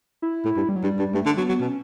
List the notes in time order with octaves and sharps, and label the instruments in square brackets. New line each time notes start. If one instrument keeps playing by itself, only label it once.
[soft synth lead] E4
[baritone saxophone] A2
G2
[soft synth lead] G3
F#3
[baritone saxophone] G2 [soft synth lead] G3
[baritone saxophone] G2
[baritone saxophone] G2 [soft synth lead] A3
[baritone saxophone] D3
[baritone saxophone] F#3 [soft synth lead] B3
[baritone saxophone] F#3
[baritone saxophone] B2 [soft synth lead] C#4